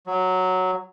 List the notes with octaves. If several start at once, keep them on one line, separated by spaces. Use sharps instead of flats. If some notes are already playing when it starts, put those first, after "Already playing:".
F#3